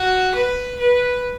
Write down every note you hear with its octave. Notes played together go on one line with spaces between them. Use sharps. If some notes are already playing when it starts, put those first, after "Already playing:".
Already playing: F#4
B4
B4